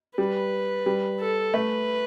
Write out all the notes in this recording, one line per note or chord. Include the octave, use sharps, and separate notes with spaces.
G3 B4
G3
A4
A3 B4